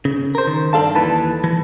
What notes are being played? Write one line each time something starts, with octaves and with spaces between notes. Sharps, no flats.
C#3
A#4 C5
D#3
G2 D4 A4 F5 A5
D#2 E3 B4 A5
E3